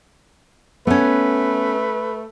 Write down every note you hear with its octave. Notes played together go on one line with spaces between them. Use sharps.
A3 B3 C#4 B4